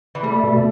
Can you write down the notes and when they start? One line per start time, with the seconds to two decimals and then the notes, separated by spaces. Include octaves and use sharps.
0.15 E3
0.23 G3 A3
0.43 B2